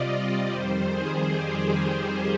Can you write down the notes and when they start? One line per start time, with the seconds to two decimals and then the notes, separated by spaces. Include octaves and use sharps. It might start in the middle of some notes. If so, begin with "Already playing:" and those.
Already playing: C3 G3 F4 D5 D#5
0.12 D5
0.51 F2 D#3 G3 C5
0.90 G#4
1.29 G4